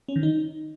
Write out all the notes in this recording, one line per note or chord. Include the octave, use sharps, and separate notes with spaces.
C#4
D#3
D#4